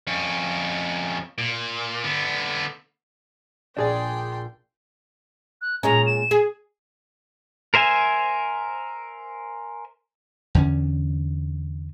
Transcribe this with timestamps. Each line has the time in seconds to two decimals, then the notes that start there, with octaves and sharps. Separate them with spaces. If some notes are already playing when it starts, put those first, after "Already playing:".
0.07 F2 C#4
1.38 A#2
2.04 D3 B3
3.77 A#1 A#2 D4 G#4 D5 G5 C6
5.62 F#6
5.83 A#2 G#3 C#4 A#5
6.06 E7
6.31 G#4
7.74 A#4 C5 E5 G#5
10.55 E2 D3 C#4